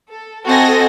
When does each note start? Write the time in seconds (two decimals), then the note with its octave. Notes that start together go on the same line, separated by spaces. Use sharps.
0.11 A4
0.46 C4 F#4 A4 D#5 G#5 A#6